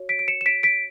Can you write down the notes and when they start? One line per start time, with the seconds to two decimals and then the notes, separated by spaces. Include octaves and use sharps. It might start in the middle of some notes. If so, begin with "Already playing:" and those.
Already playing: F#4 C#5
0.09 B6 D7
0.19 D7
0.28 C#7 E7
0.41 E7
0.46 B6 D7
0.63 B6 D7